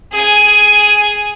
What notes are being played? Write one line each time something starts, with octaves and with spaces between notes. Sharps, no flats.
G#4 G#5